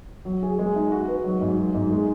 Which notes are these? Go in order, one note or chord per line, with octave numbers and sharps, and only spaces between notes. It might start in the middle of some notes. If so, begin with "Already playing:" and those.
F#3
G#4
G#3
D#4
F#4
B4
F#3
G#2
F#3
G#2
G#3